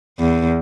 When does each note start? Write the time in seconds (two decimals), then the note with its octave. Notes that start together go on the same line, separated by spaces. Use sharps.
0.19 E2